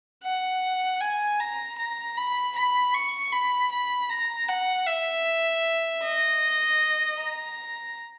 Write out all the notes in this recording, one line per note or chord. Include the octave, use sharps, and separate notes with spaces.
F#5
G#5
A#5
A#5
B5
B5
C#6
B5
B5
A#5
F#5
E5
D#5
A#5